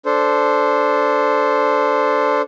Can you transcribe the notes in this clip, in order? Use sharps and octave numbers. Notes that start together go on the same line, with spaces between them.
D4 A4 C5